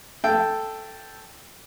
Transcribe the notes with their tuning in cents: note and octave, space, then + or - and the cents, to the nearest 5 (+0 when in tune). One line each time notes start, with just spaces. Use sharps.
A4 +0 E5 +40 G5 +0